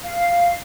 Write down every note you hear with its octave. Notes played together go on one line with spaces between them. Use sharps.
F5